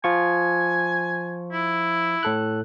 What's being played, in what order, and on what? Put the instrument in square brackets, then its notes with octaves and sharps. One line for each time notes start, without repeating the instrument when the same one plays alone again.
[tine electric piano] F3 F4 C#6 [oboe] G#5
[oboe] E4
[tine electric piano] A2 A4 F#6